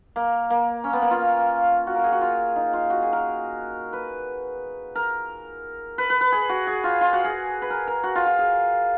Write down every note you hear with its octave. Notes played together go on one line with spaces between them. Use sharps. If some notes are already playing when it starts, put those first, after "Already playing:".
A#3
A#3
C#4
B3
A#3
F4
F#4
A#4
G#4
F#4
F4
D#4
F4
F#4
G#4
A#4
B4
A#4
B4
B4
B4
G#4
F#4
G#4
F4
F4
F#4
G#4
B4
A#4
A#4
F#4
F4
F4
G#4